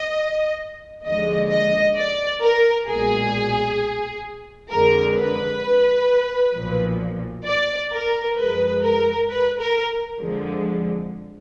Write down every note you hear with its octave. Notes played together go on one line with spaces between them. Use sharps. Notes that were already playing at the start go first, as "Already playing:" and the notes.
Already playing: D#5
D#2 D3 F3 G#3 D#5
D#5
D5
A#4
B1 A#2 G#3 G#4
F2 D3 G#3 A#4
B4
B1 A#2 F3
D5
A#4
F#2 F3 G#3 B4
A#4
B4
A#4
F2 D3 F3 G#3